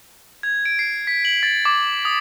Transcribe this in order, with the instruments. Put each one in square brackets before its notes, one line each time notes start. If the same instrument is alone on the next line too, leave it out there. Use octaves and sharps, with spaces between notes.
[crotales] G#6
D7
C7
B6
F#7
A6
D6
D#6